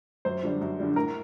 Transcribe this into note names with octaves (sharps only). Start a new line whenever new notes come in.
F#2 C5
D3 G3 D4
F#2
D3 G3 D4
A2 A#4